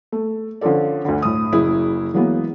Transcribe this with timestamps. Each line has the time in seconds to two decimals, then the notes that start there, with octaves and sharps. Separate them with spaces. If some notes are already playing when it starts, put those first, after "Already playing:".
0.12 A3
0.61 D3 F3 C#4 F4 A4 D5
1.05 D2 D3
1.22 A2 D#6
1.52 F#1 E4 G#4
2.14 E3 F#3 G#3 A#3 B3